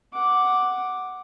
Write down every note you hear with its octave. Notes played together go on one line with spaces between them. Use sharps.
F#5 D6